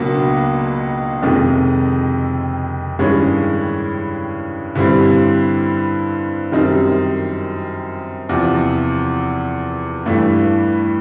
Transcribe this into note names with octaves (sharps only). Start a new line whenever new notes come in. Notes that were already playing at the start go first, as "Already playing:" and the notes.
Already playing: C#2 B2 F#3 A#3 D4
F2 C3 D#3 G#3
G2 D#3 G#3 C#4 E4
G2 D3 G3 C4 E4
F#2 D#3 G3 C4 D#4
E2 C3 F3
G2 E3 A3